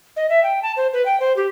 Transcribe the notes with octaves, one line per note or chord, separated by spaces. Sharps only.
D#5
E5
G5
A5
C5
B4
G5
C5
G4